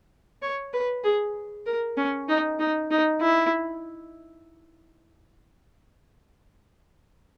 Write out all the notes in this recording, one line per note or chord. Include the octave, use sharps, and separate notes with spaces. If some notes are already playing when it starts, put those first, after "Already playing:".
C#5
B4
G#4
A#4
C#4
D#4
D#4
D#4
E4